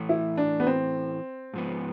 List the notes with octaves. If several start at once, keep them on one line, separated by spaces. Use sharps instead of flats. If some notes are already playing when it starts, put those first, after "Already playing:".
Already playing: A2 E3 A3
E4
D4
B3
C4
G#2 F3 B3